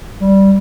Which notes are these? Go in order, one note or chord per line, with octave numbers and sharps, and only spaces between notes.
G3